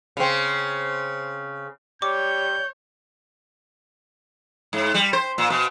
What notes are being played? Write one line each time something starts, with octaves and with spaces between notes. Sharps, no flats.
C#3 C4
G3 C#5 D6 G6
G#2
G3
C5
A#2
B2